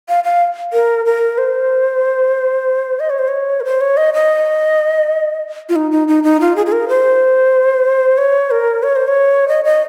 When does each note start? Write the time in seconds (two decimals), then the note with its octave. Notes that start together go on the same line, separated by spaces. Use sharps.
0.09 F5
0.24 F5
0.73 A#4
1.06 A#4
1.38 C5
3.00 D#5
3.10 C#5
3.19 C5
3.28 C#5
3.60 A#4
3.65 C5
3.81 C#5
3.97 D#5
4.14 D#5
5.69 F4
5.76 D#4
5.91 D#4
6.08 D#4
6.23 D#4
6.40 F4
6.56 G#4
6.66 G#4
6.72 A#4
6.89 C5
8.18 C#5
8.51 A#4
8.83 C#5
8.96 C5
9.08 C#5
9.48 D#5
9.65 D#5